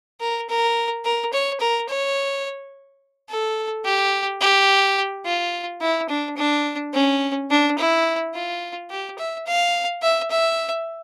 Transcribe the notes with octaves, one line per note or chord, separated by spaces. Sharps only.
A#4
A#4
A#4
C#5
A#4
C#5
A4
G4
G4
F4
E4
D4
D4
C#4
D4
E4
F4
G4
E5
F5
E5
E5